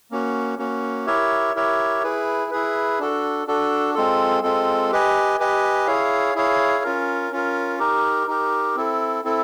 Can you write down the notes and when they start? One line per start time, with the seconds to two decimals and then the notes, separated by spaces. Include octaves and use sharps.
0.11 A#3 C#4 F#4
0.58 A#3 C#4 F#4
1.07 E4 G4 A#4 C#5 E5
1.55 E4 G4 A#4 C#5 E5
2.03 E4 G#4 B4
2.51 E4 G#4 B4
2.99 D4 F#4 A4
3.47 D4 F#4 A4
3.95 G#3 C4 F4 A4
4.43 G#3 C4 F4 A4
4.92 G4 B4 D#5 G#5
5.40 G4 B4 D#5 G#5
5.87 E4 G#4 C#5 F5
6.35 E4 G#4 C#5 F5
6.84 C#4 F4 A#4
7.32 C#4 F4 A#4
7.79 D#4 G4 A#4
8.27 D#4 G4 A#4
8.75 C4 E4 A4
9.24 C4 E4 A4